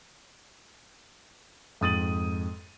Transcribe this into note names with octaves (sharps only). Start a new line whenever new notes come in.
F2 G#2 D#6 A6 D#7 F#7